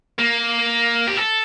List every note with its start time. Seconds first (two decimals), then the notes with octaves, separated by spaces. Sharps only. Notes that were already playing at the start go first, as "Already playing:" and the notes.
0.18 A#3
1.07 G4
1.17 A4